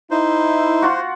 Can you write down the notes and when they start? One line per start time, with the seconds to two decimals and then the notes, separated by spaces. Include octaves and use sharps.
0.11 D#4 E4 C5
0.82 F4 F#4